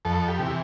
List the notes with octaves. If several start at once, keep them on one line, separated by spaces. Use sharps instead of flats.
F2 A4
G4
C3 E3